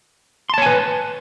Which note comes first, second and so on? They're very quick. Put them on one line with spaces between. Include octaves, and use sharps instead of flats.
C6 A5 C#5 G#5 B4